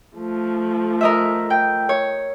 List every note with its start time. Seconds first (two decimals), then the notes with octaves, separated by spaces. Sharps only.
0.16 F3 A3
1.01 A#4 D#5 E5
1.50 G5
1.89 C#5